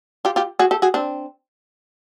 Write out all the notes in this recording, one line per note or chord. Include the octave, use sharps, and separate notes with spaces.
F4 G4
F4 G4
F#4 G#4
G4 A4
F#4 G#4
C4 D4